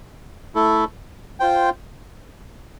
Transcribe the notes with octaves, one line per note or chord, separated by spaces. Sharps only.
A3 E4 A4
F4 C5 G5